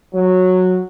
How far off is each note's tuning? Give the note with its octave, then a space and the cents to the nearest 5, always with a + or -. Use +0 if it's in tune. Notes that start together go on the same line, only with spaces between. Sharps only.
F#3 -10